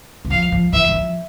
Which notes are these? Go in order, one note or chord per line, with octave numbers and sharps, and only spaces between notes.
E3
F3 F5
F3
E3 E5
F#3
F3